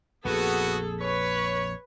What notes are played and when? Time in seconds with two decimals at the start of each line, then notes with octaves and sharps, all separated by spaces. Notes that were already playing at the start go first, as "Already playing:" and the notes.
0.25 A#1 F2 B3 F#4 G#4 A4
1.01 B4 C#5